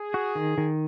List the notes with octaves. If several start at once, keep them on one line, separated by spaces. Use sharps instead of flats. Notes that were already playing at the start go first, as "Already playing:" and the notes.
Already playing: G#4
F#4
D#3
D#3